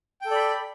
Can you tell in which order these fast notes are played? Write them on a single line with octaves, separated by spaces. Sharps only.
G5 A4 D5 B5